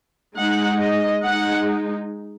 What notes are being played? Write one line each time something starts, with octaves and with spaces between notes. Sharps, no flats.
G#3 D#4 F#5
D#5
G#3 D#4 F#5